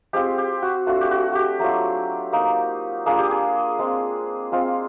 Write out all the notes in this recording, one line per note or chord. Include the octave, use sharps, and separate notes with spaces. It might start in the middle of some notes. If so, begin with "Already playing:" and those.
G#3 C4 F4 G4
G4
F#4
A3 D4 F4 F#4
G4
F#4
F#4 G4
F#3 A3 D4 F4
A#3 D#4
A#3 D4 F4 G#4
G4
G#4
G#3 C4 F4
G#3 C4 F4